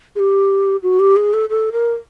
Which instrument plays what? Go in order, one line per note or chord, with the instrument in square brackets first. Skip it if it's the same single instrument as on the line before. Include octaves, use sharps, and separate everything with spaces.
[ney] G#4
G4
F#4
G4
G#4
A4
A4
A#4